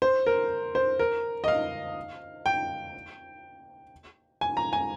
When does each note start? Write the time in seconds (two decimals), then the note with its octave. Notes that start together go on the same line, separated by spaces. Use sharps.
0.02 C5
0.27 A#4
0.75 C5
0.99 A#4
1.44 D#5
1.48 F5
2.46 G5
4.41 G#5
4.57 A#5
4.73 G#5